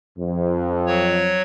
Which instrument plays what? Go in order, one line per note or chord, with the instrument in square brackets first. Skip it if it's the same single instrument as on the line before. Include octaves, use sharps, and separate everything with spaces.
[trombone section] F2
[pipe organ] F#3 C#5